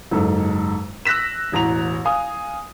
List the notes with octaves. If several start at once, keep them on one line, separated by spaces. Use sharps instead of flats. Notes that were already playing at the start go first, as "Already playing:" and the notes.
F#1 G#2 A4
E6 F#6 A#6 B6 E7
E1 A1 A#5 F7
F5 G#5 D#6